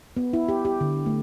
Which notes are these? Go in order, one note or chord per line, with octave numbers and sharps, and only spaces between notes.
B3
E4
G4
G4
D3
A3